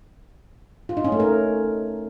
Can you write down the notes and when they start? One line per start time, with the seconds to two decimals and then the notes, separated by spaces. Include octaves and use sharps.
0.89 F4
0.97 D#4
1.04 C#4
1.12 A3
1.20 A#4